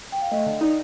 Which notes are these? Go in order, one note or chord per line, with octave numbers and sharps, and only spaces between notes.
G5
F5
A3 D#5
D3
D#4 D5